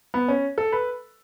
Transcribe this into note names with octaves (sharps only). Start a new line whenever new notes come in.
B3
C#4
A4
B4